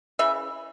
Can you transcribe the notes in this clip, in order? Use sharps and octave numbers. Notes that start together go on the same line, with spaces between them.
C#3 E3 E5